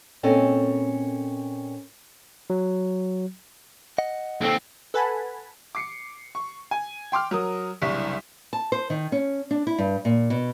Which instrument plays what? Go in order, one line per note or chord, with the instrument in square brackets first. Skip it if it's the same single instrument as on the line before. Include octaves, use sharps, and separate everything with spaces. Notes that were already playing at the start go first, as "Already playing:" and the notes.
[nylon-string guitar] A#2 C4 C#4 A4 D#5 G#5
[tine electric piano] F#3
[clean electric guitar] D#5 F#5
[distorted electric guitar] D#2 C4 [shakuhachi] A4
[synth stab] A4 B4 F#5 G#5 A5 B5
[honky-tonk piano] D6 C7 C#7
C#6
G#5
G5 C6 D6 F6
F#3 A#4 D#6
F#1 C2 D4 C#6 B6
[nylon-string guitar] A5
C5
D#3
C#4
D4
E4
G2
A#2
B2